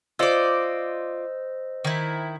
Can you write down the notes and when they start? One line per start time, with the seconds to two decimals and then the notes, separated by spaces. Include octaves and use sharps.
0.19 F4 C5 D5 D#5 E6
1.85 D#3 E4